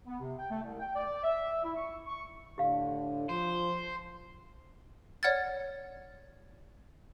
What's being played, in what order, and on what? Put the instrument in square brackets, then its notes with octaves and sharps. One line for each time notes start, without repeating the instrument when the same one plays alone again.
[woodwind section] B3
C3
G5
A3
C2
G5
D5
E5
E4
C#6
C#6
[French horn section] A2 D3 [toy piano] G4 F5
[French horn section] F3 [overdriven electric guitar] C5
[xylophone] C#5 D5 F#5 F6 G#6 A6